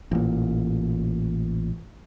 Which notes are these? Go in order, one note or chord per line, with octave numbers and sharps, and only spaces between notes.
A1 A#2